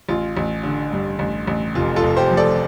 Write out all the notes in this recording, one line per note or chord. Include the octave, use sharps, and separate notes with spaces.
A1 F4
A1
D3
G2
A1
A1
F1 F4
F4 A4
F1
G4 C5
F3
A4 D5